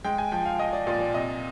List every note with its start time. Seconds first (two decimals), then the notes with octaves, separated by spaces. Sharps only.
0.05 G#3 G5
0.18 G#5
0.32 F3 G5
0.45 F5
0.59 F3 D#5
0.73 D5
0.87 A#2 D5
1.01 D5
1.14 C3 D#5